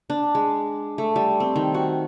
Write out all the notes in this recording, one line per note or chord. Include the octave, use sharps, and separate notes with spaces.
D4
G#3
A3
G3
C4
D#3
F#4